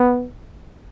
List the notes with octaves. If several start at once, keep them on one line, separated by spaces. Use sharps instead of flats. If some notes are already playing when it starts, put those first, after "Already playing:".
Already playing: B3